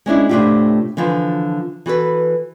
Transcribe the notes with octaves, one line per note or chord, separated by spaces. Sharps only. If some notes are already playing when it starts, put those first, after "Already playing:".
G#3 C#4 D4 E4
A2 C3 A3 D4 F4 G4
D3 E3 F3 F4
E3 F#4 A4 B4